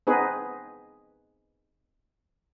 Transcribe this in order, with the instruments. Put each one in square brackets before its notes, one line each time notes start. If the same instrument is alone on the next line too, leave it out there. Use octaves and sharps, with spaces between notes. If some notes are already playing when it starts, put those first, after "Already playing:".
[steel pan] B3 C4 D#4 G#4 B4